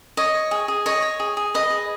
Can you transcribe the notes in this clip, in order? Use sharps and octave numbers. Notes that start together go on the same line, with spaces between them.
C#5 D#5
C#5
G#4
G#4
C#5 D#5
C#5
G#4
G#4
B4 D#5
G#4